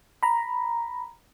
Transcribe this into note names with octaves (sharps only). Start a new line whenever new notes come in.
A#5 B5